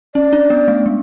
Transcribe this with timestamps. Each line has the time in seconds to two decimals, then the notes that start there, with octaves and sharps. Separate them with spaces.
0.15 C#4 D5
0.33 D4
0.50 B3
0.68 A3
0.86 G#3